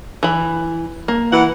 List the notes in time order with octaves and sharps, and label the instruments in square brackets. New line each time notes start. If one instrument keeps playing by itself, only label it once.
[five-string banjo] E3 B5
A#3
[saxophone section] E3 F#5